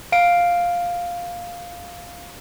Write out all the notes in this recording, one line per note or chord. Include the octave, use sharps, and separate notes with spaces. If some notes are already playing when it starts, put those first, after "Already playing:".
F5 D7